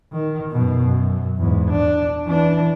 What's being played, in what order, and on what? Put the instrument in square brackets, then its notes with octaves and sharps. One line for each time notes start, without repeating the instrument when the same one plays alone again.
[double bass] D#3
F#2 B2
F#2
E2 G#2
D4
E3 D4